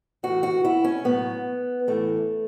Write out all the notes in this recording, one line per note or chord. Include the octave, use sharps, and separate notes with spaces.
A2 E3 F#4
F#4
E4
C#4
A2 F#3 B3
A2 E3 A3